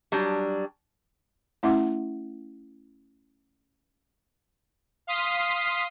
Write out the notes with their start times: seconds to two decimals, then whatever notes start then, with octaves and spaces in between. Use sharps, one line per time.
0.12 F#3 G3 D4
1.63 A3 C#4 E4 E5 F#5 D6
5.07 F5 C6 D#6 B6 C7